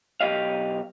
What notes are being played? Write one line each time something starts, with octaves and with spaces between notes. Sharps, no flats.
B1 D#3 G4 D#5 F5